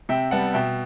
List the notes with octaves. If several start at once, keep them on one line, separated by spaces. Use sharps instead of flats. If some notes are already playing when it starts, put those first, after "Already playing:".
C3 E5 G5
G3 B3 F#5 A5
B2 E5 G5